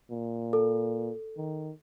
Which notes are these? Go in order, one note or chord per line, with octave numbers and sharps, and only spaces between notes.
A#2
A4
D#3